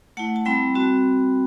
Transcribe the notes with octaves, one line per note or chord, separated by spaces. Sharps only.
A3 E4 F#5 A5
A5
G3 C4 E4 G5 B5
G3 C4 F#4